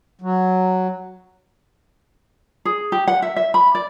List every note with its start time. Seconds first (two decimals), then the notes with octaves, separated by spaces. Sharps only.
0.21 F#3
2.65 G#4
2.92 G4
3.08 F#5
3.22 E5
3.36 E5
3.54 B5
3.75 D5